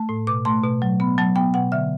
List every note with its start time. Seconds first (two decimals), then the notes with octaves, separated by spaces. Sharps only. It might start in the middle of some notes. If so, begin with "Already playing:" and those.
Already playing: A3 A5
0.09 A2
0.27 B2 D6
0.45 A3 C6
0.64 B2
0.82 F#3
1.00 B3 B5
1.18 F#3 A5
1.36 B3 G5
1.54 B2 F#5
1.72 D3 E5